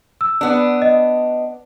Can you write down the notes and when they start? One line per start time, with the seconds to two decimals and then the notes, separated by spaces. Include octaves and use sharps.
0.21 E6
0.41 B3 D4
0.82 D#5